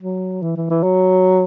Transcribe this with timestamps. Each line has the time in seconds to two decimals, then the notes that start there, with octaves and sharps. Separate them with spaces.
0.02 F#3
0.42 E3
0.56 E3
0.70 E3
0.83 F#3